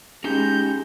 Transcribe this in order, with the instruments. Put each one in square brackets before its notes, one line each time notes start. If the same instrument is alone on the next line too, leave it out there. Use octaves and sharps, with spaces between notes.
[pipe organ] G#3 G6 [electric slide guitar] C#4 D#4 G4